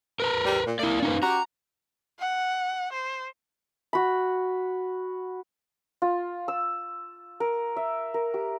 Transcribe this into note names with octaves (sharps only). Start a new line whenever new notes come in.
A#4 B4 A#5
G3
A#2
A#3 E4 D5
C#4 D#4 B4
C#4 F#4 G4 A#5
F#5
C5
F#4 B5
F4
E6
A#4
E5
A#4
G4